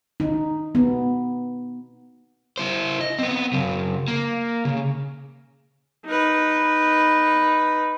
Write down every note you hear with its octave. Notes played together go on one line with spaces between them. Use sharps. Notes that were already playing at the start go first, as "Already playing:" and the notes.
D#4
B3
E4 C5
D#5
B3 C4
C#3 F#3
A#3
C#3
D#4 B4